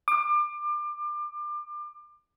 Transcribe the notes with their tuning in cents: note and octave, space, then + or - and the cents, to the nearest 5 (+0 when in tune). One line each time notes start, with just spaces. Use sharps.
D6 +30